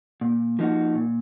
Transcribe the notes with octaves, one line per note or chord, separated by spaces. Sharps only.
A#2
F3 A#3 D#4 F#4
A#2